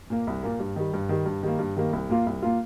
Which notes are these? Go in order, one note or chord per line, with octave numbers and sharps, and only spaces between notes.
A#2 A#3
C2
A#2 A#3
G2
D#3 G3
G2
D#3 G3
G2
D#3 G3 A#3
G2
D#3 G3 A#3
C2
A#2 A#3 F4
C2
A#2 A#3 F4